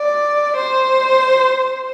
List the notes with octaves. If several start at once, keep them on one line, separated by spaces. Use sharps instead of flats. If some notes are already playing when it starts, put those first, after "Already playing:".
Already playing: D5
C5